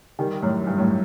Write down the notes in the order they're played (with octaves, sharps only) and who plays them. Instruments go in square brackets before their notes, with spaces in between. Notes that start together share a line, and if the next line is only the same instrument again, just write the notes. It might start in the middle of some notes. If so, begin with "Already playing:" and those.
[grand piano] D#3 G3
F#2 A2
G2
F#2 A2